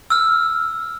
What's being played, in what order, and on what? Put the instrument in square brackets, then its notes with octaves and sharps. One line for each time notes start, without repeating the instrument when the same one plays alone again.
[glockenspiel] E6 F6